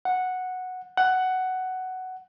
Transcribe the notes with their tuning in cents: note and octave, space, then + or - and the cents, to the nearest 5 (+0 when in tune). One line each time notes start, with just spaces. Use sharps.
F#5 -5
F#5 +10